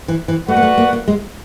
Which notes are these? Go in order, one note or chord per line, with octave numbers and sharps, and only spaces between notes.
E3
E3
A3 F#4 B4 D5 F#5
A#3
A3
A#3
A#3
G#3